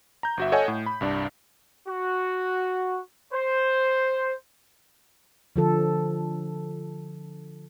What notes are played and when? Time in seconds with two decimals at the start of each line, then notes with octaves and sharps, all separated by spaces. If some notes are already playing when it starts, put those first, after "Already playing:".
0.23 A#5 G6
0.37 G1 F#4 E5
0.52 A4 C#5 D#5 F#5 G#5
0.68 A2
0.86 B5
1.01 C2 G2 D4
1.88 F#4
3.34 C5
5.56 D3 F3 A4